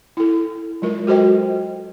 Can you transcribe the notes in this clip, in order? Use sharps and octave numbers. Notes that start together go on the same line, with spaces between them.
E4 A4
F#3 G#3 F4 A#4
F#4 A4 C5 D#5 G5